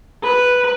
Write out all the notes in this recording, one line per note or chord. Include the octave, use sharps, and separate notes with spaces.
B4